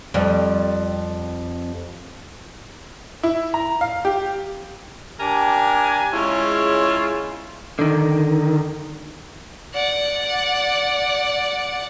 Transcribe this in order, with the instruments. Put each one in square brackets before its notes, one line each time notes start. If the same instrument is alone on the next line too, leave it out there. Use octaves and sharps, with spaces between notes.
[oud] F2 G3
[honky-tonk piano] E4
A#5
F5
G4
[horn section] D4 G4 A#4 G#5
C#3 G#3 C#4 E4 F4
[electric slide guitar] D3 D#3
[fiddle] D5 F#5